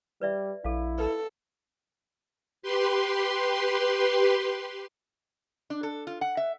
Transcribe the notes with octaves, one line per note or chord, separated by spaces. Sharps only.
G3 B4 D5 E5
A#1 E4 A4 F5
A4 B4
G4 B4 C6
D4
A4
F4
F#5
E5